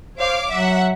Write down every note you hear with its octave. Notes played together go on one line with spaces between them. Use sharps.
C5 C#5 F5 D6
F#3 E5 F#5